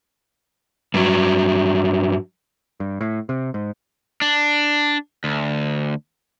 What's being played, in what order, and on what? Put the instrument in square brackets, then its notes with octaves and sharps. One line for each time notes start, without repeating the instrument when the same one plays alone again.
[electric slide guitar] G2 F#3
[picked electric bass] G2
A2
C3
G#2
[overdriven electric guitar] D4
D2